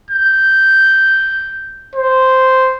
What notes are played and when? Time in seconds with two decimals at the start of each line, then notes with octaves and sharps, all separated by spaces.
0.11 G6
1.96 C5